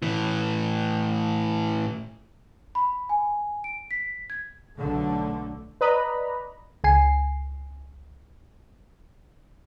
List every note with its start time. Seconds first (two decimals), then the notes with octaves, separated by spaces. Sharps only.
0.02 A2 E3
2.75 B5
3.09 G#5
3.64 D7
3.91 B6
4.30 G#6
4.78 B1 D3 A3
5.81 B4 D5 D#5 A#5 B5
6.84 C#2 G#5 C7